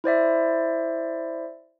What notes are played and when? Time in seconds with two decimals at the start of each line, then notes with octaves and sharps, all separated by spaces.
0.04 E4 C5 D5 E5